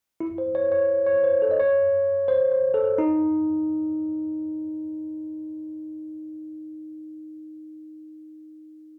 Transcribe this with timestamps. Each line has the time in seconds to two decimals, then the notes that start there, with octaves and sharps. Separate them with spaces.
0.20 E4
0.38 C5
0.55 C#5
0.72 C#5
1.06 C#5
1.24 C5
1.42 A4
1.51 D#5
1.60 C#5
2.28 C5
2.51 C5
2.74 A4
2.98 D#4